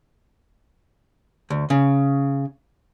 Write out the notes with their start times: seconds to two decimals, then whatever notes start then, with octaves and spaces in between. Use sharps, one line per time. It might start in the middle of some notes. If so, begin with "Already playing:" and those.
1.50 D2
1.70 C#3